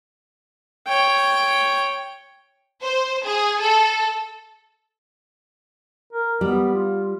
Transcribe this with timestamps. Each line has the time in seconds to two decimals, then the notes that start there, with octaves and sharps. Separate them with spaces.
0.87 C#5 G5
2.82 C5
3.24 G#4
3.61 A4
6.13 A#4
6.41 G3 B3
6.74 F4